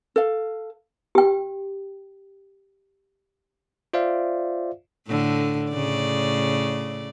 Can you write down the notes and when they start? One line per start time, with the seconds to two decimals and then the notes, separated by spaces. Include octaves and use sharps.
0.16 A4 F5
1.15 G4 G5
3.93 F4 C5 D5 E5 F5
5.08 A2 D3
5.71 A2 C#3 D5